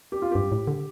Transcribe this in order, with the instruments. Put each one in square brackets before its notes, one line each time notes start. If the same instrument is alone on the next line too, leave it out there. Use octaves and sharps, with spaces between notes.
[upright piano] G4
F4
[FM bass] G2 [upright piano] G4
[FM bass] A2
D3